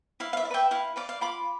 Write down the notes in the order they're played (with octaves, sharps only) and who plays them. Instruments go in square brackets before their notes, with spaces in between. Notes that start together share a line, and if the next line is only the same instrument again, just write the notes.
[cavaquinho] E4 F5
F5
E5
D5
B4 E5 G5
E4 F5
B4 D5 F5
F5
F4 B5 D6